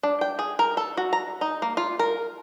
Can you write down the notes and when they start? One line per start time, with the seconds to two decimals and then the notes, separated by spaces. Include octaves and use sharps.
0.03 D4
0.21 G5
0.39 G#4
0.59 A#4
0.77 A4
0.97 F#4
1.13 A#5
1.41 D#4
1.62 A#3
1.77 F4
1.99 A#4